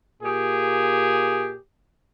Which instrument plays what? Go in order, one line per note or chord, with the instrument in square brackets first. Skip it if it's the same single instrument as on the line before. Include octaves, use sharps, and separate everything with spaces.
[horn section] A#2 G4 G#4